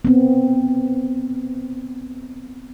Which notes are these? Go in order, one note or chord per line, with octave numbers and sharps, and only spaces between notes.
B3 C4